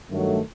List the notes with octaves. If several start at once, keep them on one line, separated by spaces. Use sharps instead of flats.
G2 D#3 F#3 A3